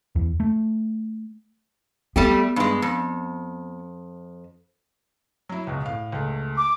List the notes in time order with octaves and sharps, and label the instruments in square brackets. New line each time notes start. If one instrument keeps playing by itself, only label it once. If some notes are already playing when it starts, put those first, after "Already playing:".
[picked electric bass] E2
A3
[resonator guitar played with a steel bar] G3 A3 G4 [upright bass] B3
[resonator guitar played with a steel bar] G2 G#3
F2
[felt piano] F#3 E4
C#2 B2
A2 F5
C#2 A3
[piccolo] D6